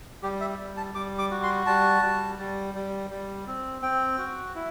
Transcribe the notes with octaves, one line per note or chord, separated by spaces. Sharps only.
G3 G4
E5
G3
A5
G3 D6
D6
F#4
C6
G3 A5
G3
G3
G3
G3
C4
C4 G5
F#4
E4